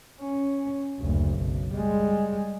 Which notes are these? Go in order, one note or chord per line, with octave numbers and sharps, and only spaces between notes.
C#4
F#1 D2
B1
G3 G#3